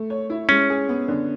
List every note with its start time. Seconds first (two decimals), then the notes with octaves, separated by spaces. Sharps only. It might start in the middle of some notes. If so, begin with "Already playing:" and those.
Already playing: A3
0.10 C#5
0.30 E4
0.49 G#3 C#4
0.70 G#4
0.89 B3
1.08 D3